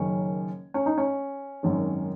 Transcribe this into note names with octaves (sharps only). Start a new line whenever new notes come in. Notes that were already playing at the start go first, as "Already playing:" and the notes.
Already playing: F#1 F#2 D#3 C#4
C#4
D#4
C#4
G#1 F#2 D#3